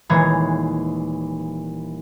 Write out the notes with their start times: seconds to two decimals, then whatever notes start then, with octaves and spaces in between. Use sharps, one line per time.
0.09 D#1 E3 G#3 C#5 A#5 G#6